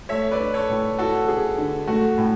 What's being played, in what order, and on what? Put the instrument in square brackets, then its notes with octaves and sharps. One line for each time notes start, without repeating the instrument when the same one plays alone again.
[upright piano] A3 [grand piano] C#5 E5
[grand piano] B4 D5
[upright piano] D4
[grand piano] A4 C#5
[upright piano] A2
[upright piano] E4 [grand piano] F#4 A4
[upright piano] G#4
D3
[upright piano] A3 [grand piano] F#4
[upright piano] A2